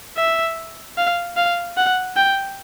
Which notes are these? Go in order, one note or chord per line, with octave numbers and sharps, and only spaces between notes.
E5
F5
F5
F#5
G5